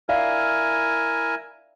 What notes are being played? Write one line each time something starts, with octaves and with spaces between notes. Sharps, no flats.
E4 A#4 D5 E5 F5 G#5